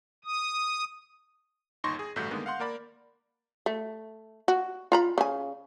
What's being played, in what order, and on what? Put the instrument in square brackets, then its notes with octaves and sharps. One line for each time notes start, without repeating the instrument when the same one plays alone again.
[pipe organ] D#6
[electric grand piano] G1 D#2 D#4 C6 C#6 A#6
G#4
A1 G2 D3 A3 F#4 G6
D3 D#3 G#3 A#3 B3
F5 F#5 C6
A#3 A#4 D5 B5
[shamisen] A3
F#4
F4 A#5 B5
C#3 G#5